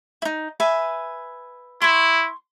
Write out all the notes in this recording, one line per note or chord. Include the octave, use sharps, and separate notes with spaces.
D#4 E4
B4 E5 G#5
E4 C6 C#6